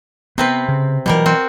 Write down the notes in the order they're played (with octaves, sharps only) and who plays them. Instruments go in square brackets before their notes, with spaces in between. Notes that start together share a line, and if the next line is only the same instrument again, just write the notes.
[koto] C3 C4 B4 [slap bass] B3
[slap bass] C#3
[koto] B2 G3 A#4 [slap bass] E3 F#3
[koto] C4 F#4